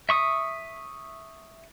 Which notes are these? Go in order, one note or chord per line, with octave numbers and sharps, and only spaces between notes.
E5 C#6 D#6